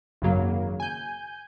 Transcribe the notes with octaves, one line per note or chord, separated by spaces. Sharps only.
G#1 F#2 C#3 F#3 A#3
G#5 G6